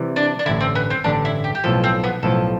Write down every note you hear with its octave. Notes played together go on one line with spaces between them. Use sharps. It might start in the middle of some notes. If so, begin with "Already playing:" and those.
Already playing: C3 E3 G3
D4
D4
A1 G2 D3 E4
C4
B3
C4
A1 G2 D3 D4
E4
G4
G4
B1 A2 F3 A4
C4
B3
B1 A2 F3 A4